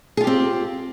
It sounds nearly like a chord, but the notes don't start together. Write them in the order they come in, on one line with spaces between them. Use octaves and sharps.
G#4 F4 G4 C4